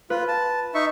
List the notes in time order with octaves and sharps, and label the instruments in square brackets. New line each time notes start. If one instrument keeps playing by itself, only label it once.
[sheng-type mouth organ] F4 [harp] B4
[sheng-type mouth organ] A5
D#4 E5 C#6